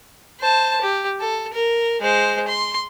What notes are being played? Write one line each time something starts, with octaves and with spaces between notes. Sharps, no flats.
C5 A5
G4
A4
A#4
G#3 C5
C6